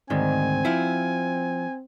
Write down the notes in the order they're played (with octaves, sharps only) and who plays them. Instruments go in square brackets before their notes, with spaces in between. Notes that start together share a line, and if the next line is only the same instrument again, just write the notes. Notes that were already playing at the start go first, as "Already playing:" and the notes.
[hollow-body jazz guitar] D2 G#2 D#3 [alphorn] C4 [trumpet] G#5
[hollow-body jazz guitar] F3 E4